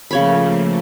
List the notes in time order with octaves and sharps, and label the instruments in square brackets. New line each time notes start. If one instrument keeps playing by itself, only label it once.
[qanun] C#3 C#5 B5 [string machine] F3 A3 A#3